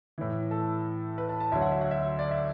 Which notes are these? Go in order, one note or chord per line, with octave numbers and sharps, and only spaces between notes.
A2 E3
A4
B4
A5
A5
D2 D3 F#3 E5
F#5
E5
F#5
E5
D5
E5